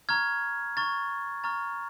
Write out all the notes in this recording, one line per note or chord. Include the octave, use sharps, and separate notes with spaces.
A#5 C#6 F6 G#6
A#5 C#6 F6 A6
A#5 C#6 F6 A6